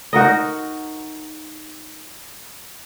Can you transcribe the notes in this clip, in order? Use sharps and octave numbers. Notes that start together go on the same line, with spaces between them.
D#4 F#4 A#4 D#5